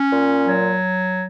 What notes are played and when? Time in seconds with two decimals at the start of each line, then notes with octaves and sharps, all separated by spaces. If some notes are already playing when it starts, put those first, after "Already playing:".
Already playing: C#4
0.12 A#2
0.47 F#3